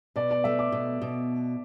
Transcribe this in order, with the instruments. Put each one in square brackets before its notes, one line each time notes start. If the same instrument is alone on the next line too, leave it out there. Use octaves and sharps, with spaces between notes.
[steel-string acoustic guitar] B2 [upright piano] D5
[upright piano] D5
[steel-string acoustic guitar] A3 [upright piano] E5
[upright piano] D6
[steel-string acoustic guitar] B2
B2